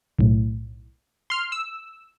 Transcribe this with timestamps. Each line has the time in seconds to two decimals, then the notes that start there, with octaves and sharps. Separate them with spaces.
0.19 B1 A2
1.30 C6 F6
1.52 E6